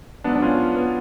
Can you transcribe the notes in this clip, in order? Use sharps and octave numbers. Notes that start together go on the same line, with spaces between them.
G#2 F#3 B3 D4
D4
C#4 F4
B3